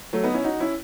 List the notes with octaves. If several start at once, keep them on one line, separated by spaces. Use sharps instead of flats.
F#3 A3
B3 D#4
C#4 E4
D#4 F#4
C#4 E4